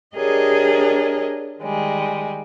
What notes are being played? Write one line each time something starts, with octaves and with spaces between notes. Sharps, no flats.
D4 G4 G#4 A#4 C#5 D#5
D#3 G3 G#3